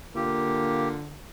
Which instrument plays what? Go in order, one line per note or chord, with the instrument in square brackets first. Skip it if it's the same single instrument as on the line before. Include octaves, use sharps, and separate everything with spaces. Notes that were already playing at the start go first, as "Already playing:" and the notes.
[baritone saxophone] D3 [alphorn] A#3 [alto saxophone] F4 [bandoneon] G4